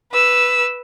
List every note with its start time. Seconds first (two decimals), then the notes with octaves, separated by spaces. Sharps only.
0.12 B4 E6